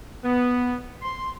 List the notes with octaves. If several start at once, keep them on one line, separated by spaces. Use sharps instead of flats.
B3
C6